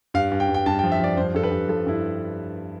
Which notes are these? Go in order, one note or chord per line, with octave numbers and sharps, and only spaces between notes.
G2 F5
G2
G5
G2
G5
G2 A5
G5
F3
E5
F3 D5
G2 C5
G2 A4
B4
G2
F3 A4
G2 E4